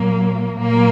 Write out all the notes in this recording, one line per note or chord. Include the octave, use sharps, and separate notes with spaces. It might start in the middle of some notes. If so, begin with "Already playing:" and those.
Already playing: A#2 F#3 A#3
A#2 F#3 A#3